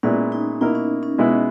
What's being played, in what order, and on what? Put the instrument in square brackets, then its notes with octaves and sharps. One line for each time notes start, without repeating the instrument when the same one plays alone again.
[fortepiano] A#2 G#3 B3 E4 [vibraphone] C#4
[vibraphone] D#4
[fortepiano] B2 A#3 E4 A#4 [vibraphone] D#4
[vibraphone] C#4
C#4
[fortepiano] B2 G#3 B3 E4 G#4